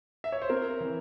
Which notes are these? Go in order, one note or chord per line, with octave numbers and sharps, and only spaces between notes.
E5
C#5
C5
C4 A#4
E3